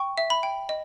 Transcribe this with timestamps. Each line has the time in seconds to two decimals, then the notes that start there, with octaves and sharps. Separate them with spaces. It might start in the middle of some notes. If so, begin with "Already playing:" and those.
Already playing: G5 C#6
0.18 E5
0.30 B5
0.43 G5
0.69 D#5